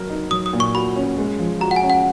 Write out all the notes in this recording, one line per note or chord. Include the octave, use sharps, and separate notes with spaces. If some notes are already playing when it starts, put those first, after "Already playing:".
Already playing: F#3 A#4
D#4
F#3 D#6
D#6
A#2
C#6
F#4 B5
C#4
G#3
F3
F#4 A#5
F#5
G#5
C#4
F#5